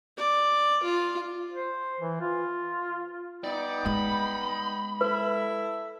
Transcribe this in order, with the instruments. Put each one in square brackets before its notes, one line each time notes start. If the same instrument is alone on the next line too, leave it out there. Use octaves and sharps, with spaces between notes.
[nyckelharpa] D5
F4
[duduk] C5
E3
F4
[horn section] G3 B3 D#4 [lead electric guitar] D5
[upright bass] G#3 [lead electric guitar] B5
[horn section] E4 A4 E5 [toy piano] B4